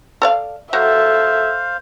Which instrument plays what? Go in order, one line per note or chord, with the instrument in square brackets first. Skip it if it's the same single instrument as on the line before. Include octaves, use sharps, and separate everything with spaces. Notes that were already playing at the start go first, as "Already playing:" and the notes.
[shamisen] A4 D5 F5
[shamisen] F#3 [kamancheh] A4 E5 [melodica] C5 F5